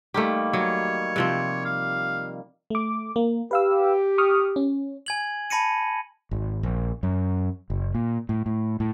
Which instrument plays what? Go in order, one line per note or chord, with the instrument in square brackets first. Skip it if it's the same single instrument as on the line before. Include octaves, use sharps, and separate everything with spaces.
[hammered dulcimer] D#3 G3 A#3 [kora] A3 G4
[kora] F#3 [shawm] C#5
[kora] C3 F3 C4
[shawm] F5
[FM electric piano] A3 D6
A#3
[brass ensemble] G4 [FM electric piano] B4 F5 E6
[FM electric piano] C#6 D#6 F6
C#4
[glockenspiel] G#5 G#6 F#7
A5 B5 A#6 C#7 D#7
[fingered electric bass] G#1
A#1
F#2
F#1
A#2
A2
A2
A2